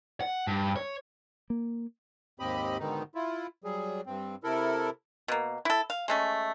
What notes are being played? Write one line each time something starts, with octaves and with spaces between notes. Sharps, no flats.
F#5
G2
C#5
A#3
D#2 G#2 C4 G4 D#5 B5
G#2 B2 D3 D#3 B3 D#4
E4 F4
F#3 G3 G#4
G2 C4
C3 E4 A4 A#4
B2 A#3
E4 A4
F5
G#3 A3 C#4